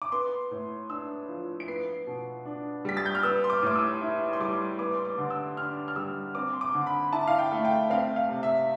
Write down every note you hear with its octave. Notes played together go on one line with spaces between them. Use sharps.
D6
B3 C6
A2
D4 E6
F3
D7
B3 C7
B2
D4
G3 B6
A6
G6
F6
B3 E6
C6
D6
A2 D6
E6
E4
C6
G3 D6
B3 D6
C6
D6
D3
E6
D4 F6
F6
G3 E6
C4 D6
C6
D6
D3
B5
E4 A5
F5
G5
A3
G5
C4 F5
F5
C3
E5